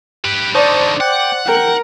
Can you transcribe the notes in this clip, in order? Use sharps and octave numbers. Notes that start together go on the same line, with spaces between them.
G4 B4
D3 D#4 C5 D5 A5 C#6 D#6
F#5 G5 D6 F#6
A#4 G5